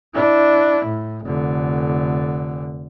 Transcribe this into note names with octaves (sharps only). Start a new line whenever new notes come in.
D4 E4
A2
F1 D3